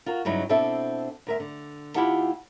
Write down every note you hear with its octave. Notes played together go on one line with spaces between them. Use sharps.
F4 F#4 A#4
G2 C#3 F#3 D#4 E4
B2 C4 D4 E4 A4 E5
D2 A#4 E5
D3
D#2 E4 F4 G4 F#5 A5